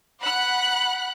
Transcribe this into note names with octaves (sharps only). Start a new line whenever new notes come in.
F#5 B5 F#6